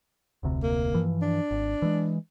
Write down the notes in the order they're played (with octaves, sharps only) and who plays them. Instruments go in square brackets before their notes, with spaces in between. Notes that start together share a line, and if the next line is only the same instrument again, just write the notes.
[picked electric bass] F1 D2 C3
[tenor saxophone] A#3
[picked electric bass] G2 E3 F3
[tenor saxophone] D4
[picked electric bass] G#1
E3 G#3